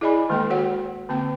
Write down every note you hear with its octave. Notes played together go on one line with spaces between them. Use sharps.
E4 G#4 D5 D#5 G#5 B5
D#3 G#3 A#3 A4 G5
F#4 C#5 F#5
D3 A#3 C4 G5